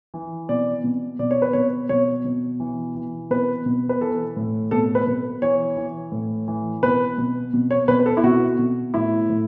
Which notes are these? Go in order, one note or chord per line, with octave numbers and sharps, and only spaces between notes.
E3
B2 D5
B2
B2 D5
C#5
B4
B2 C#5
B2 C#5
B2
E3
E3
B2 B4
B2
B4
E3 A4
A2
B2 A4
B4
B2
E3 C#5
E3
A2
E3
B2 B4
B2
B2
C#5
B2 B4
B4
A4
E4
B2 F#4
B2
A2 E4
A2